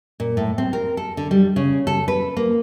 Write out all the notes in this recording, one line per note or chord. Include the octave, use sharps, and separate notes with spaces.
A#2
A2
C4
A#4
A4
D3
G3
C#3
A4
B4
A#3